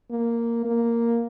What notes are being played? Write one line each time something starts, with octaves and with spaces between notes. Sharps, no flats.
A#3
A#3